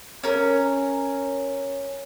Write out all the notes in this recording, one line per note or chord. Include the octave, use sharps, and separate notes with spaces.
C#4 A#4